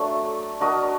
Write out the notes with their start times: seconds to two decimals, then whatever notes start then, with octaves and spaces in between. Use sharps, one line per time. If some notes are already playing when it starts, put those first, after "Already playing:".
Already playing: F#3 A3 D4
0.61 D4 F#4 A#4 D#5